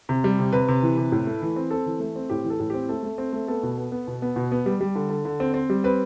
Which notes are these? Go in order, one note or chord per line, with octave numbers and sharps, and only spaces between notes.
C3
G3
C3
C3 B4
C3
E3
C3
A2
A3
E3
C4
C4 A4
E3
A3
C4
A2 G4
E3
A4
A2
C4 G4
A3 A4
A3
C4
A3
B3 A4
B2
B3
B3
B2
B3
B2
B3
G3
G3
D3
D3
D3
C4
C4
G3
C4 B4